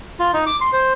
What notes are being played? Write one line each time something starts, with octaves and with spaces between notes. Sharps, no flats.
F4
D#4
D6
C6
C5